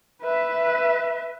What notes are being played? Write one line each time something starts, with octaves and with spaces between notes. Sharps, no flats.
B4 E5